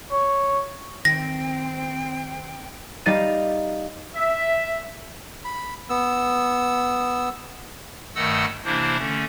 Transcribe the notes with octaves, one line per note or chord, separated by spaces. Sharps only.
C#5
D#3 C4 G5 A#6
G3 D#4 F5 A6 D#7
E5
B5
B3 E6
G2 D#3 A3 D#5 F#5 E6
C3 E3 A#3 D4 E4 C5
D3 A3 C#4